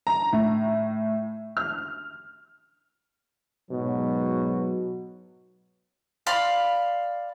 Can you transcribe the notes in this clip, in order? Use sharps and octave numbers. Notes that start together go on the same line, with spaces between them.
A#5
A2
F6
G#2 B2 F#3
D5 F5 B5 C6